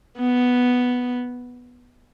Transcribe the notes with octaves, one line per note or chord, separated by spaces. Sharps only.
B3